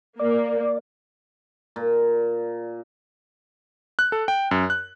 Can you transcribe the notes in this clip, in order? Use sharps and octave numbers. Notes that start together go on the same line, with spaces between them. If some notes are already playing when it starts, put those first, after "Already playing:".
A#3 D5
A#2
F#6
A4
G5
F#2
F#6